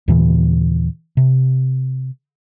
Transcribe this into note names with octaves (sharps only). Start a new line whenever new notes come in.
D#2 A#2 C#3 E3
C3